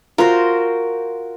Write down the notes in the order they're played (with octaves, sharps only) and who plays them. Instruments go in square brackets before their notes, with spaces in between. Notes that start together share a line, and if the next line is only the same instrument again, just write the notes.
[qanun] F4 F#4 C5 [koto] A#4